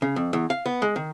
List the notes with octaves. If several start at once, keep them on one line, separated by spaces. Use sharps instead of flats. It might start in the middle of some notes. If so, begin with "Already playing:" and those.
C#3
F2
E2
F5
B3
G#3
D#3